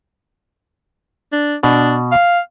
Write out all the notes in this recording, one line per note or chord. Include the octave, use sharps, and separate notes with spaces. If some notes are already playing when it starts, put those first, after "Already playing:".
D4
B2 D4
F5